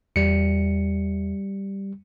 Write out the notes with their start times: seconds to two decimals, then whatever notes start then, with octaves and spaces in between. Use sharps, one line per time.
0.16 E2 G3 C#7